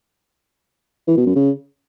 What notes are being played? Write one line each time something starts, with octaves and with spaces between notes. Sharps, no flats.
E3
B2
F#2
C#3